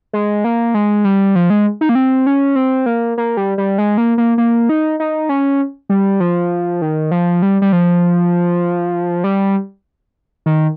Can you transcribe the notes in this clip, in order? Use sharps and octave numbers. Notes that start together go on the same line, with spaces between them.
G#3
A#3
G#3
G3
F3
G#3
D#4
A#3
C4
C#4
C4
A#3
A#3
G3
G3
G#3
A#3
A#3
A#3
D#4
D#4
C#4
G3
F3
D#3
F3
G3
G3
F3
G3
D#3